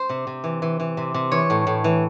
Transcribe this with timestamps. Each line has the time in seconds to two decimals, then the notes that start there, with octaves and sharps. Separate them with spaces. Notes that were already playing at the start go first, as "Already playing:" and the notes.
Already playing: C5
0.09 C3
0.27 C3
0.44 E3
0.62 E3
0.80 E3
0.97 C3
1.14 C3
1.32 E3 C#5
1.50 A2
1.67 A2
1.84 E3